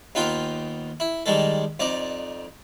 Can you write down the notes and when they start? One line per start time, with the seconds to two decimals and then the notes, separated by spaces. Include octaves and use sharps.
0.15 D#2 B3 D#4 F4 G5
1.00 E4
1.26 D#3 G3 G#3 A4
1.80 F2 D#4 D5